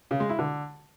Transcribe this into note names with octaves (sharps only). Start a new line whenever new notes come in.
C#3
G#3
E4
D3